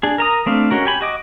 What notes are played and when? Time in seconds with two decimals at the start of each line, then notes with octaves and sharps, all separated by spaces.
0.03 D4 G#4
0.18 A#4 A#5 D#6
0.46 A3 C4 D4 F5
0.71 G#3 C#4 F#4 A#4
0.86 G4 G#5 B5
1.01 F#4 D#5 D6